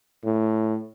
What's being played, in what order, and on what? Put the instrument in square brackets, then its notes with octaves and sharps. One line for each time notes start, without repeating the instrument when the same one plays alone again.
[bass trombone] A2